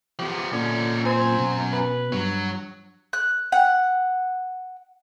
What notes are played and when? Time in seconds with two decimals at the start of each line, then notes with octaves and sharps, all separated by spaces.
0.19 F3 B3 G4
0.53 A#2 D3 C#4 D#4
1.06 F#2 C4 G#5
1.39 B2
1.73 B4
2.12 G2 F#3
3.13 F#6
3.52 F#5